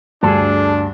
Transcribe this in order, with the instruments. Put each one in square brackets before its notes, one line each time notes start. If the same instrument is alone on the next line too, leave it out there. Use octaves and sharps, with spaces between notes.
[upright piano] D2 G2 [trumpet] D4 [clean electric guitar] G#4 A4